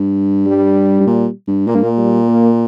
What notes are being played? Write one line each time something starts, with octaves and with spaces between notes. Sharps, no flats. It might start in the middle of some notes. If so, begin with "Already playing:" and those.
Already playing: G2
G3
G2
A#2
G2
A#2 A#3
G2
A#2
G3
A#3